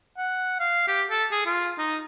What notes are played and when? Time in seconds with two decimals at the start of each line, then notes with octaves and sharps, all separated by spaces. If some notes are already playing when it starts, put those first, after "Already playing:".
0.17 F#5
0.60 F5
0.88 G4
1.10 A4
1.32 G#4
1.46 F4
1.78 D#4